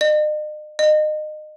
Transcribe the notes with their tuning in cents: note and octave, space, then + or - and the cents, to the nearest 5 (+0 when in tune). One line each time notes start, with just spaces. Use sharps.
D#5 -45
D#5 -30